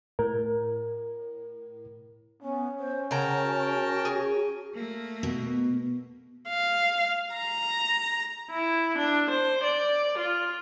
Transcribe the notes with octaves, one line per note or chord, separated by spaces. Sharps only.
A2 A#4
B3 C#4
C5
C#3 A#4 F#5 G5 A5 A#5
F#4
G#4
A3 A#3
B2
F5
A#5
E4
D4
C5
D5
F4